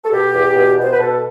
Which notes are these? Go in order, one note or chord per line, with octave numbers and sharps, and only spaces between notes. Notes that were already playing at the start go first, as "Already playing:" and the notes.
A4
B2 G4
E2
B2
B2
C5
B4
B2 A4